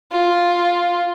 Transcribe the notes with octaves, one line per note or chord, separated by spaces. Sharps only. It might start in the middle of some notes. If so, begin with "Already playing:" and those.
F4